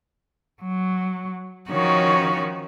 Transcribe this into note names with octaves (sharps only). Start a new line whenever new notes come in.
F#3
D#3 F3 C#4 D#4 F#4 C#5